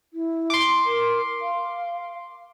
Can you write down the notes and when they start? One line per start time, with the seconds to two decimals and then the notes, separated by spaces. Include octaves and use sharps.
0.13 E4
0.50 C6 D6
0.85 A#4
1.41 F5